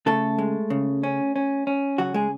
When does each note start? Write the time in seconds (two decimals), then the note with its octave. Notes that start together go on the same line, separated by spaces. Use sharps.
0.06 C#3 A3 A4
0.38 G#3
0.70 C#3
1.03 C#4
1.36 C#4
1.67 C#4
1.98 C#3 F#3 F#4
2.14 G#3 G#4